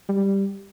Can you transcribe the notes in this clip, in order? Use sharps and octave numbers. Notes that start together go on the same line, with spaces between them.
G3